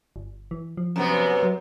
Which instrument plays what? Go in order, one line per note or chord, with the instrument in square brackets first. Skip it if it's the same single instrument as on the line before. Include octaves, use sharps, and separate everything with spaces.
[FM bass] G1
E3
F3
[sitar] F#2 C3 B3
[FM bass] F#3